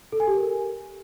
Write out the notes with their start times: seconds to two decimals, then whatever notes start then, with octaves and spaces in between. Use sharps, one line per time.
0.12 A4
0.20 G#5
0.27 G4
0.35 A#4